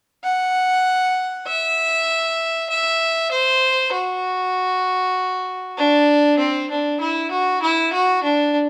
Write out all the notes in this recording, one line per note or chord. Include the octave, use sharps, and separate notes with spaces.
F#5
E5
E5
C5
F#4
D4
C4
D4
E4
F#4
E4
F#4
D4